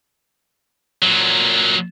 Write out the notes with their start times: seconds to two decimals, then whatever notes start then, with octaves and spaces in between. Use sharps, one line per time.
1.02 A#2 F#3